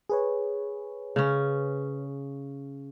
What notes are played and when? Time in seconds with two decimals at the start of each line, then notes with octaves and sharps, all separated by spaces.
0.10 G#4 B4 C#5
1.16 C#3 C#4